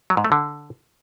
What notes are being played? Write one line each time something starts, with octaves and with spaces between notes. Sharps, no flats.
F#3
G#2
A3
D3